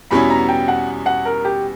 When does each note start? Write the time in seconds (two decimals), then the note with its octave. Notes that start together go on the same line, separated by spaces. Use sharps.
0.11 E2 B2 G3 C#4 E4 B5
0.30 A#5
0.49 G5
0.68 F#5
1.06 F#5
1.25 A#4
1.45 G4